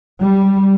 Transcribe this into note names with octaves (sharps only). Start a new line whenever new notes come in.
G3